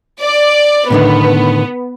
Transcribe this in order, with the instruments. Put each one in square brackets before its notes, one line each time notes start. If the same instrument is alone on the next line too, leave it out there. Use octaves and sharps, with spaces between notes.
[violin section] D5
[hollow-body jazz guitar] A2 D3 D#3 [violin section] B3